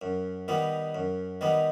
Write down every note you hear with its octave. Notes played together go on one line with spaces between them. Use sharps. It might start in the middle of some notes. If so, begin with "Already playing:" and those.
F#2
D#3 G3 B3 D#4
F#2
D#3 G3 B3 D#4